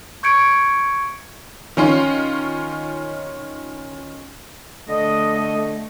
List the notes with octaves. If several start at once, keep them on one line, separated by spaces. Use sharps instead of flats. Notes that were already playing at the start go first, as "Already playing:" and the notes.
C#6 G6 G#6 C#7 D7
D#3 C#4 F4
D3 A3 D#5